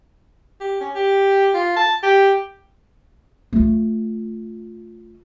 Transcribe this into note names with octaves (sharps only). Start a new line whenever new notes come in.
G4
C#4
G4
F4
A5
G4
A3 F4